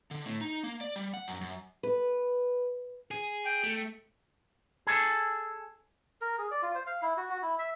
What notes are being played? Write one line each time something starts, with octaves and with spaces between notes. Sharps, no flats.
D3
A2
D#4
A#3
D5
G3
F#5
F#2
F#2
B4
G#4
G5
A3
G#4 A4
A#4
G#4
D5
F4
C5
F5
E4
F#4
F#4
E4
E5